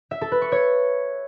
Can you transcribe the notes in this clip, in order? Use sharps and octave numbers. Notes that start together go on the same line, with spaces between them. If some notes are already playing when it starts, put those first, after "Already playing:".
E5
A4
B4
C#6
C#5